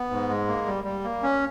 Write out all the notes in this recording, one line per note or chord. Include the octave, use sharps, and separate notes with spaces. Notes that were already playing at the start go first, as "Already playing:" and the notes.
Already playing: B3
G#2
G#3
A#3
G3
G3
A#3
C#4